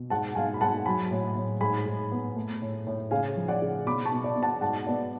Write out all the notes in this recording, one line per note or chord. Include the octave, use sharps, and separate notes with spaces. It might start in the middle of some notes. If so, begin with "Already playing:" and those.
Already playing: B2
G#2 F#5 A5
G#2 F5 G#5
B5
G#2 F#5 A5
F#3 G#5 B5
A2
A2
G#2 G#5 B5
G#2
B3
A3
A2
A2
C#3 F5 G#5
F3
D5 F#5
C#3
B2 B5 D6
A5 C#6
B2
D5
B2
F#5 A5
G#2 F#5 A5
B3 D5